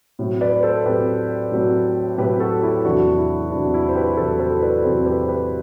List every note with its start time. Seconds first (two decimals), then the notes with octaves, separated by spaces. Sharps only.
0.19 A2 F#3 C4
0.41 B4 D5
0.53 B4
0.63 A4 C5
0.85 A2 F#3 C4 G4 B4
1.52 A2 F#3 C4
2.18 A2 F#3 C4 G4 B4
2.40 F#4 A4
2.63 E4 G4
2.85 E2 C3 F#3 C4 D4 F#4
3.18 E4
3.51 E2 C3 F#3 C4 D4
3.74 E4
3.89 C5
3.95 G4 B4
4.17 E2 C3 F#3 C4 A4 C5
4.39 A4 C5
4.63 B4 D5
4.84 E2 C3 F#3 C4 A4 C5
5.06 G4 B4
5.23 C5
5.28 G4 B4